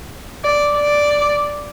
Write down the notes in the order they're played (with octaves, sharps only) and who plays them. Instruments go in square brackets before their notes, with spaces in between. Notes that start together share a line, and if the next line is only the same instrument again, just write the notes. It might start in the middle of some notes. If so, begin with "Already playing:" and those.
[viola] D5
D5